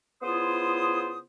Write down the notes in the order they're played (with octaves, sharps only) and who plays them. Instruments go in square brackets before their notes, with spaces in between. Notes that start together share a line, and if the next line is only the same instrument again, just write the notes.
[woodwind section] C#3 B3 E4 F4 C5 D#6